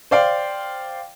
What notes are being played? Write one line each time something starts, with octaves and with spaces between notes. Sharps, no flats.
C5 D5 F5 G5